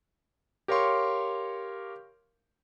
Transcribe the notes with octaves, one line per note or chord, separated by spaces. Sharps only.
G4 A#4 C#5 F5 C6 C#6